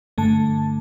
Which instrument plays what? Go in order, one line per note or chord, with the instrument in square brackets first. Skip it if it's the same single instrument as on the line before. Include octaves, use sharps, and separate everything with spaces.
[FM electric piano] G2 D3 A3 A5